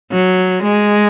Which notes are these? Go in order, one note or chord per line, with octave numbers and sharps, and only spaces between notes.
F#3
G#3